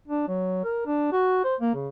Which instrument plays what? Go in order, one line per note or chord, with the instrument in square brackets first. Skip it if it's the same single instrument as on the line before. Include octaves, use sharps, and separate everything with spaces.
[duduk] D4
F#3
A#4
D4
F#4
C5
A#3
C#3